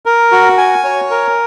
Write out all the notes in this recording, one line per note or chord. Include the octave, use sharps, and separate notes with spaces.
A#4
F#4
G#5
C#5
A#4